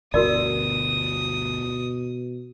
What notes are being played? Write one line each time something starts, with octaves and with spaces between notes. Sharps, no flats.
G1 D2 B2 D3 F#4 A#4 D5 D#6